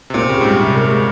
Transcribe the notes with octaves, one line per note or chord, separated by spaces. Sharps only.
C3
A#2 C4
C#3 G4
G#2
A#2 G3
C3
A#4
G#3